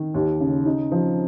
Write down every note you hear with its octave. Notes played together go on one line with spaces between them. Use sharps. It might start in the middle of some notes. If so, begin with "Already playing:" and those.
Already playing: D#3
D#2
C#3
D#4
F3